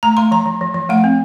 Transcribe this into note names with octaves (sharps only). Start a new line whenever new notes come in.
A3 A#5
A3 C6
F3 A#5
F3
F3
F3
A3 F#5
C4